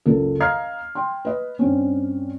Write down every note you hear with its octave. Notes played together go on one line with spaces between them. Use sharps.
F#1 C#2 A4
D#5 F5 A#5 F6 G#6 C7
G5 C6
B4 D#5
G2 C4 C#4